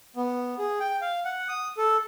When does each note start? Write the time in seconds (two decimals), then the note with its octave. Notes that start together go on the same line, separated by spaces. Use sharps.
0.16 B3
0.59 G#4
0.80 G5
1.01 F5
1.25 F#5
1.48 D#6
1.78 A4